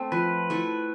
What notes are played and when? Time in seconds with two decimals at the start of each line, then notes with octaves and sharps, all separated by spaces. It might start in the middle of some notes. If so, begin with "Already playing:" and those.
Already playing: A3 C4
0.12 F3 B4
0.50 A3 E4